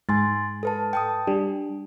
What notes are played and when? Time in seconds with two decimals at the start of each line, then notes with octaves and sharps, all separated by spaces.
0.09 G#2 G#5 C6 A6
0.63 A4 B4 A5
0.93 G5 A5 D#6
1.27 G3 D4